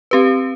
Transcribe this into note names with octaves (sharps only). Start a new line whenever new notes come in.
C4 G4 B4